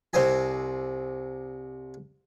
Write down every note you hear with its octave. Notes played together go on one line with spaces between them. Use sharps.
C2 C3 C5 D#5 G#5